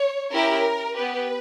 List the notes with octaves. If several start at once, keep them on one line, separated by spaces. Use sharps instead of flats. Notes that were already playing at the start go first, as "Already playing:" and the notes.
Already playing: C#5
C#4 E4 G4 A#4
B3 G4 B4